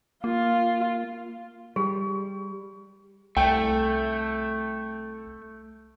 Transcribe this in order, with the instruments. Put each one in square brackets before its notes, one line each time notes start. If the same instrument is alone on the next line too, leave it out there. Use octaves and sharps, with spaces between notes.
[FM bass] A#3 [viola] F4
[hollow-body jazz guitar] G3 [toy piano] G#4
[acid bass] C2 [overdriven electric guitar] A3 [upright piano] G5